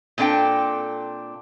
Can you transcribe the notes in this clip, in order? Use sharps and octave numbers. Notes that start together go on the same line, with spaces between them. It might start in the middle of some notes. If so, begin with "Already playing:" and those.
A#2 C4 D4 A4 G5